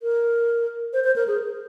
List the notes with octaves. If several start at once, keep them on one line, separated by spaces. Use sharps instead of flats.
A#4
C5
C5
A#4
G#4